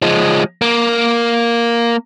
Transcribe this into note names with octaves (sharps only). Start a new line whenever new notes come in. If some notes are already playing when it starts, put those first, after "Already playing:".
F3 G#3
A#3